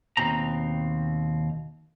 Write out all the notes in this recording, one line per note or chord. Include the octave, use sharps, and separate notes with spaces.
D#2 B2 C4 A#5